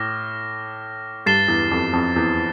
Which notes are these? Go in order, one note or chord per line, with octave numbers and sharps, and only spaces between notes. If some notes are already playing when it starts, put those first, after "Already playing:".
Already playing: A2 D6 F6 A#6
G2 A6 C7 E7 G7
E2
F2
F2
E2